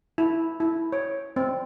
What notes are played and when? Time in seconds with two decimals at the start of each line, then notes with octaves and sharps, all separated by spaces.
0.18 E4
0.60 E4
0.92 C#5
1.36 C4